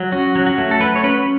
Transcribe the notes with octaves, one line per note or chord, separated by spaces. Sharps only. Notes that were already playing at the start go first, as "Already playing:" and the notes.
Already playing: F#3
C#4 F#4
F#3
F#4
A3
A4
F#3 B4
C#5
C#4 B4